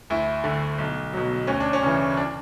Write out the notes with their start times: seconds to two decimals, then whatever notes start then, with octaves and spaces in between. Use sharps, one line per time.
0.10 D2 E4
0.44 D3 A3
0.78 B1
1.13 B2 F#3
1.47 D2 C#4
1.60 D4
1.73 C#4
1.82 C#3 E3
2.17 D4